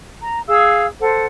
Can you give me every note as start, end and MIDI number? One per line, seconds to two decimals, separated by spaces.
0.23 0.39 82
0.48 0.85 68
0.48 0.85 77
0.48 0.85 88
1.00 1.25 69
1.00 1.25 72
1.00 1.25 78